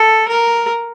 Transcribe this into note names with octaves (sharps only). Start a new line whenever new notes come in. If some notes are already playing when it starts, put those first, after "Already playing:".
Already playing: A4
A#4